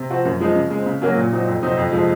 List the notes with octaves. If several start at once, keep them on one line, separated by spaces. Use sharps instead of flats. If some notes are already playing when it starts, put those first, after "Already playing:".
Already playing: C3
F3 C4 F#4
F#2
F3 G#3 D#4
C#3
G#3
C4
C#3
F#3 A#3 C#4 F#4
A#2
F#3 C4 D#4
F2
C3 F#3 C4 D#4
F2
C3 F3 G#3 D#4